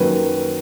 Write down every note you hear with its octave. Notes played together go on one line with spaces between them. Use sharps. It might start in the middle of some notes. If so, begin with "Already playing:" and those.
Already playing: F#2 D#3 F#3 A#3 B4